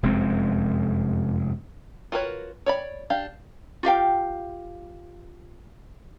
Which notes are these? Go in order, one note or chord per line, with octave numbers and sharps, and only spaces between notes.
F1 F#2 G#3 C4
F4 F#4 A#4 B4 C#5
C#5 D5 B5
D4 G4 F5
F4 G4 F5 G5